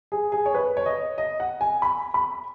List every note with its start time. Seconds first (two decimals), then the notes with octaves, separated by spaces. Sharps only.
0.12 G#4
0.32 G#4
0.46 C#5
0.55 B4
0.77 C#5
0.86 D#5
1.18 D#5
1.40 F#5
1.61 G#5
1.82 B5
2.14 B5